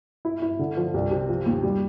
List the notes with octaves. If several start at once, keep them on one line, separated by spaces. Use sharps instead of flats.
E4
E4
D3
F3
C2
C3
F3
D#2
G3